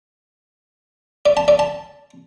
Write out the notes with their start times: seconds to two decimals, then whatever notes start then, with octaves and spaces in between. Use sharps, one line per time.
1.26 D5
1.37 A5
1.48 D5
1.59 A5